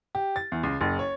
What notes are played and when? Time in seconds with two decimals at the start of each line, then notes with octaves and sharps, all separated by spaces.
0.15 G4
0.36 A6
0.52 E2
0.63 C#2
0.81 F#1
0.99 C#5